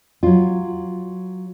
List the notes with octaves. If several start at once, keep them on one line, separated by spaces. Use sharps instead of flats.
F#3 F4